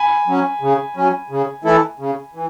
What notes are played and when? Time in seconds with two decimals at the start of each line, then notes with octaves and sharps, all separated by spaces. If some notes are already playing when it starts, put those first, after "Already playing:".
Already playing: G#5 B5
0.27 F#3 C#4
0.61 C#3
0.96 F#3 C#4
1.30 C#3
1.64 E3 A3 E4 A4
1.99 C#3
2.34 E3